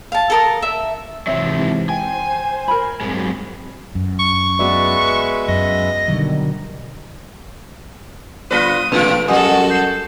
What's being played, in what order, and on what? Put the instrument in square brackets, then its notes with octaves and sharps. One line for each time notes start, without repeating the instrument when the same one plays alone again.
[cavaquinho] F5 A5
A4 A#4 D#6
E5
[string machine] G#2 C3 E3 [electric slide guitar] F#3 C4 [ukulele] C#5 E5
[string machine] C5 [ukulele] G5 [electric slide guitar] G#5
[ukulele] A#4 B5
[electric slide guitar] G2 G#3 [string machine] F#3 C4
[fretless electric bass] F#2
[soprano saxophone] C#6
[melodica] G#3 B4 E5 [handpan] B3 F#4 D5
[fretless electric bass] F#2 [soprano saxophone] D#5
[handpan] B2 D#3 G3 [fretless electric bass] D3 F#3
[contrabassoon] G1 [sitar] F4 A4 B4 [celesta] D5 A#6 G7 [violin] D#6
[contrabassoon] A#1 [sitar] B2 F4 [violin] A3 D7 [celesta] B4
[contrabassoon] F#2 [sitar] G3 [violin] F#4 A4 [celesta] F#5 G#5 D#6
[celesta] G6 C7